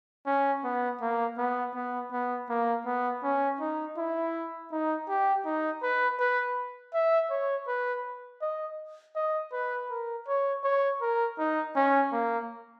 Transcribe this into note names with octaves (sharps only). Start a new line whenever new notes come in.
C#4
B3
A#3
B3
B3
B3
A#3
B3
C#4
D#4
E4
D#4
G4
D#4
B4
B4
E5
C#5
B4
D#5
D#5
B4
A#4
C#5
C#5
A#4
D#4
C#4
A#3